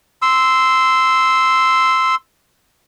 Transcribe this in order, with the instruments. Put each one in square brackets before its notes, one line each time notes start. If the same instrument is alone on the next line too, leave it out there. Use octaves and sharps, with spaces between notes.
[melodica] C6 E6